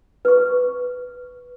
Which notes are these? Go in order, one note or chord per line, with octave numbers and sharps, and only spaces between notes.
B4 C#6